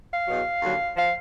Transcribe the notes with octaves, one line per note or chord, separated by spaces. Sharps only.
F5
E2 B2 F#3
D#2 D3 F#3
F3 F5